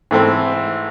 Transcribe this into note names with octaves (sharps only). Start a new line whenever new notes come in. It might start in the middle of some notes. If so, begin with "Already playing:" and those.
G#2 E3 A3 C4